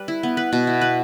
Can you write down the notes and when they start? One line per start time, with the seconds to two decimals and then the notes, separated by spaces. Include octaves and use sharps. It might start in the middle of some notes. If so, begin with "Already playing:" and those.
Already playing: G3 B4
0.08 E4
0.23 B3
0.37 B4
0.53 B2
0.67 E4
0.81 B4